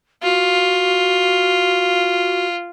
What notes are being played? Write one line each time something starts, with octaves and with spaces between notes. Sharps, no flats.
F4 F#4